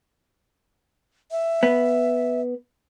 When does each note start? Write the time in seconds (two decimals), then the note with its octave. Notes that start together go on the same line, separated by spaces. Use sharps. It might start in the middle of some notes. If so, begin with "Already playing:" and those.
1.32 E5
1.63 B3